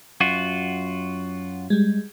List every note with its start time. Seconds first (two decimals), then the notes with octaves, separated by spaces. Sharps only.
0.21 F#2 F4 F#4
1.70 G3 G#3